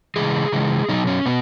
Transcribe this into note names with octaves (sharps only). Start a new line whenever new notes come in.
C#3 E3 G#3 G#4
C#3 E3 G#3
B2 F#3 D#4
C#4
B2 B3